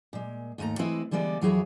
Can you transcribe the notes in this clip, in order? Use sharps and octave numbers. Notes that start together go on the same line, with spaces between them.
A#2 G#3
D#2 G#2 A3 G#5 A#5
E3 G#3 C4 E4 B4 D#5
D3 E3 G3 G#3 B3 D5
F2 E3 F#3 E4 G#4 C#5